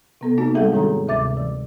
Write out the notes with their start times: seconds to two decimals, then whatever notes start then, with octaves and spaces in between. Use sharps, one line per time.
0.21 C3 B3 A4
0.38 A#3 C4 D#4 F#4
0.55 G3 G#3 G#4 A4 E5
0.72 G#2 D#3 D4 G#4 A4 A#5
1.08 D2 C3 E5 D6 A6
1.37 E3